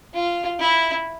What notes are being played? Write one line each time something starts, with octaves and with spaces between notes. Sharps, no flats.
F4
E4